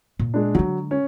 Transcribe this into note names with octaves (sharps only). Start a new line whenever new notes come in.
A#2
G#3 D4
D3 F#3 G#3
C#4